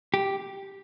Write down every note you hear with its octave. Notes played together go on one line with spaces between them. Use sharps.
G4